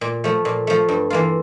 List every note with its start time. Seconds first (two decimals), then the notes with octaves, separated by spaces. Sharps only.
0.01 A#2
0.24 F3 A3
0.45 A#2
0.67 F3 A3
0.89 G2
1.10 E3 A#3 F4